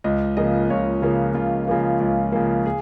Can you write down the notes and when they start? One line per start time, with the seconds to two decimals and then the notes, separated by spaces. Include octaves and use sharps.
0.04 C#2 D#5
0.37 C#3 F3 A#3 D#5
0.70 C#2 C#5
1.02 C#3 F3 A#3
1.34 C#2 F4
1.68 C#3 F3 A#3
2.00 C#2
2.32 C#3 F3 A#3
2.66 G#4